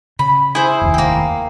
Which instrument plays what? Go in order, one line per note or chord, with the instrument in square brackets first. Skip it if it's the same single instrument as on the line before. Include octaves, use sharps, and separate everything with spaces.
[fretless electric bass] C#3 [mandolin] B5
[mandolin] E4 [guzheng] G#4 C5
[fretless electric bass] F1 D#2
[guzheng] A#3 C4